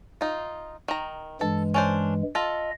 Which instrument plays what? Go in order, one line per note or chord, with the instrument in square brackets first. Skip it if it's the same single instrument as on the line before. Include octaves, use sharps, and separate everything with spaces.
[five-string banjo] D#4 F4
D#3 A#5
[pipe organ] G2 E3 G#3 [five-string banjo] A4
[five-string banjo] C#4 D4 C5
[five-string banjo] F4 A4 [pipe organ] D#5